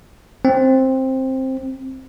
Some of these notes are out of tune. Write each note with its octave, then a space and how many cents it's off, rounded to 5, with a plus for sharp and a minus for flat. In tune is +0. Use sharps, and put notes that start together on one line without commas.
C4 +10